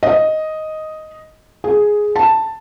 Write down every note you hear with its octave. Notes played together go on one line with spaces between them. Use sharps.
D#5
G#4
A5